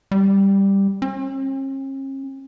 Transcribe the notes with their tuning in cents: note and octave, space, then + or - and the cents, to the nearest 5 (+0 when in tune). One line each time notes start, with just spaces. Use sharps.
G3 +5
C#4 -45